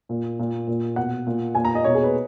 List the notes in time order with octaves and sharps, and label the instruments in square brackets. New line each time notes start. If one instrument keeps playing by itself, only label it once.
[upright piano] A#2
A#2
A#2
B2 F#5
A#2
A#2 G#5
A#5
D#5
B2 C#5
G#4
B4